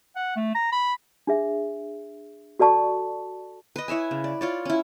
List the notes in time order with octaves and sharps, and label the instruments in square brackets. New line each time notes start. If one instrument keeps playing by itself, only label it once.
[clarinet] F#5
A3
A#5
B5
[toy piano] D4 G#4 E5
F#4 A4 D5 A5 C#6
[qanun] B4 D#5
E4 C#5 E5 G#5
C#3
D5
F4 C#5 D5
C#4 E4